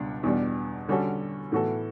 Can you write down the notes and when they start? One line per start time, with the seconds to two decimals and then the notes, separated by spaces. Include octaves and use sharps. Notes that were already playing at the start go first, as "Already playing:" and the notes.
Already playing: C#2 B2 G3 D4
0.23 E2 B2 G3 D4
0.88 D3 G3 C#4 F#4 A4
1.52 A2 E3 B3 F#4 A4